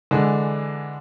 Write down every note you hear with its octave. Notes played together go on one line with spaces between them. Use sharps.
D3 E3 G#3 D4